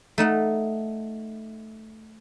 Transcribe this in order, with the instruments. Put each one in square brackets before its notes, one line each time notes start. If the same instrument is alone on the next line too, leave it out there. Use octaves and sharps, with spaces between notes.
[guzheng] A3 D#4 F#5